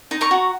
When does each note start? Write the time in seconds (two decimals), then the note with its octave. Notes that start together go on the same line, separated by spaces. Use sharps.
0.11 D#4
0.21 A#5 C#6
0.31 F#4